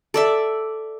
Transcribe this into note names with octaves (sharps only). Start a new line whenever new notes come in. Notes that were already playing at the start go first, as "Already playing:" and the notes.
A4 D5 E5